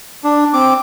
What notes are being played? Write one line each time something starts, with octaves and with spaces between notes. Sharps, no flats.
D4
C4 D6